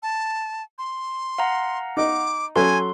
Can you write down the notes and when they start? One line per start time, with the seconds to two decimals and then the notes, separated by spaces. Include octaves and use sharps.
0.03 A5
0.78 C6
1.38 F5 F#5 A#5
1.97 D#4 D#5 D6
2.56 F#3 C#4 A4 G#5 C6